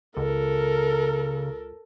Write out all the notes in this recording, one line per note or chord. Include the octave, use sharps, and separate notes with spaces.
C#2 C#3 A4 A#4